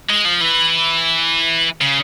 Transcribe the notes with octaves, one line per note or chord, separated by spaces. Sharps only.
G#3
F3
E3
C#3